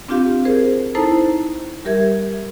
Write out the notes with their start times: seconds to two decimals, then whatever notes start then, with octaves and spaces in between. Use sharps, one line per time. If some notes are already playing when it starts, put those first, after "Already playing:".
0.08 C4 D4 F4 G4 F5
0.45 G#4 A#4 C5
0.95 D#4 E4 A4 C5 A5 A#5
1.85 G3 G4 A#4 E5 G#6